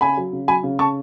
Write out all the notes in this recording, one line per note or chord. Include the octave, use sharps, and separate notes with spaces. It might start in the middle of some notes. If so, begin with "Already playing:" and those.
C#3 G#5 B5
F#3
C#3
F#3 G#5 B5
C#3
C#3 A5 C#6